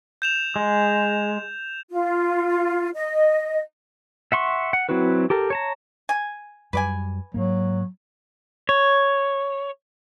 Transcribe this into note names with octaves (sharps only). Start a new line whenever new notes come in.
G6 E7 F7
G#3
F4
D#5
E5 F#5 C6 C#6
F#5
F#3 C4 E4 F#4 B4
G4 A4 A#4
C#5 A5 A#5
G#5
F#2 G3 B4 D5 G#5
G#2 F#3 A#3
C#5